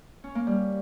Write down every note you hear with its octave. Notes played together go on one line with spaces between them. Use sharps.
C#4
A#3
G3